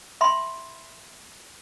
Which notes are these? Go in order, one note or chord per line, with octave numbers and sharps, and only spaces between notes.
E5 B5 C6